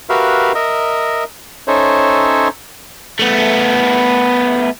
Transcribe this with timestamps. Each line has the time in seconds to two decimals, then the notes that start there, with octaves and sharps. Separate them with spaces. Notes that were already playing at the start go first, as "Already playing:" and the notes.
0.10 F#4 G4 A#4 B4 E5 F5
0.55 A#4 D#5 E5
1.68 C#4 D#4 A4 C5 C#5 E5
3.19 A3 B3